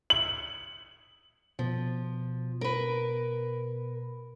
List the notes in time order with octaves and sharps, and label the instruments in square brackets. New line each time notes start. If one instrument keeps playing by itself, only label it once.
[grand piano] F#7
[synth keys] B2 [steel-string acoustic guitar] F3
[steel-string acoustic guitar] A#4 B4